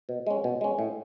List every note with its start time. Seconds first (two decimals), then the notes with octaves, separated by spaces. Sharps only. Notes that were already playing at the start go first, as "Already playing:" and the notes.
0.09 B2
0.27 G#3 C#4
0.44 B2
0.61 G#3 C#4
0.79 A2